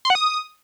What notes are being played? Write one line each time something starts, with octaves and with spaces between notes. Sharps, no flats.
C6
F#5
D#6